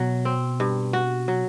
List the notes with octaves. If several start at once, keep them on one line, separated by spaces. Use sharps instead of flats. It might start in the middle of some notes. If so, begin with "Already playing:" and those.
Already playing: B2 F#3
C4
G2
F#4
F#3